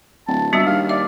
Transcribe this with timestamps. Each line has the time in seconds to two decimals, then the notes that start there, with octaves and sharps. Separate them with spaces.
0.28 D1 A5
0.53 G1 G3 D4 F#4 E5
0.66 D#2 F5
0.89 D5 E5